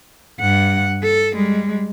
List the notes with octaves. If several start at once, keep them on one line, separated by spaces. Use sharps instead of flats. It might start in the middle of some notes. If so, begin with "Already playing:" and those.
G2 F#5
A4
G3 G#3